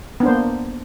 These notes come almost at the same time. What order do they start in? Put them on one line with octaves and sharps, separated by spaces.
B3 D4 C5 A#3